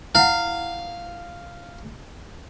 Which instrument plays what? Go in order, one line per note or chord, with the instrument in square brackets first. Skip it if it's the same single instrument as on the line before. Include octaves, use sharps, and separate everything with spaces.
[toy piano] E4 F#5 [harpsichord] F5